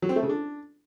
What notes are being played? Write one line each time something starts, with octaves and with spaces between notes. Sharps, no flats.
F#3
C4
A3
C#3
D4